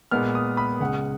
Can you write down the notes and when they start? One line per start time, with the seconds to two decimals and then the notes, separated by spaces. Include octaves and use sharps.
0.11 A#2 G#3 B3 F6
0.35 D#6
0.57 B5
0.80 C#2 C#3 G#3 F#5